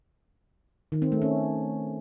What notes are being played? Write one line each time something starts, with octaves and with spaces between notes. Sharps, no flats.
D#3
C4
A3
C#4